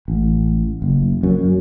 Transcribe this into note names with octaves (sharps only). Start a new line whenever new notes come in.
A1
F#1
F#2